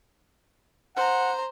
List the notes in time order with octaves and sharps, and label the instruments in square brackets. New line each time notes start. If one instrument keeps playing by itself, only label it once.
[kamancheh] C5 A#5 [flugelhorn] F#5